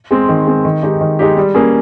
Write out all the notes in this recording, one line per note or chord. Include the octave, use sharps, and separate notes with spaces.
G#3 C4
D#3
G#3 C4
D#3
G#3 D#4 G4
D#3
G#3 D#4 G4
G3
A#3 C#4 G#4